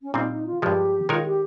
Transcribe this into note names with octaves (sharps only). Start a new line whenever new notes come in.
C#4
A#2 G3 C4 D#4
D#4
F4
G2 F3 G#3 G4
D#3 G#3 D#4 F4 A#4 C#5
F4
G4